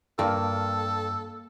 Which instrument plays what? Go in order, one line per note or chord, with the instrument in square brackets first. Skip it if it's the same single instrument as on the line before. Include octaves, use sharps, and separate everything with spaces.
[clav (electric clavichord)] G2 [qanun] A#3 [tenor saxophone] A4